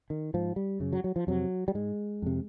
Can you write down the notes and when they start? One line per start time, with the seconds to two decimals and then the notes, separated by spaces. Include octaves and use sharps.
0.10 D#3
0.34 G#2 F3
0.56 G3
0.80 F#2 C#3
0.93 F#3
1.04 F#3
1.16 F3
1.27 F2 C3 F#3
1.68 G3
1.74 G#2 G#3
2.22 F2 C3